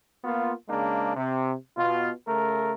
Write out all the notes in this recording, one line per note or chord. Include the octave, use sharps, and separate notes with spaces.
A#3 B3 F4
C#3 G#3 A#3 D4
C3
B2 F4
C#3 A3 A#4